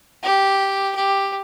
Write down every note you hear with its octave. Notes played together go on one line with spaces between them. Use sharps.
G4
G4